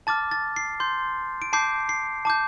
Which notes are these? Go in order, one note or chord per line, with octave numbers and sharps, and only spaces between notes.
A5 D6 F6 A6
A6
C7
C6 G6
D7
A5 D6 G6 C7
C7
A5 D6 G6